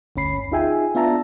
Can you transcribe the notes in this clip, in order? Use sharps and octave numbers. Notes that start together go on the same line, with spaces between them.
G1 D2 C#4 B5 C7
D#4 F4 G#4 E5 G5 G#5
B3 D4 F4 E5 A5 A#5